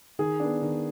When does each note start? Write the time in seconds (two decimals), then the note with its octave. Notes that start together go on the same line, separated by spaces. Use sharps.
0.19 D#3 G#4
0.40 B3 D4
0.62 D#3